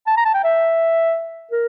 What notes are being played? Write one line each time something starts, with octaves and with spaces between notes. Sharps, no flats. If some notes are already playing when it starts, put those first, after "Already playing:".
A5
A#5
A5
G5
E5
A#4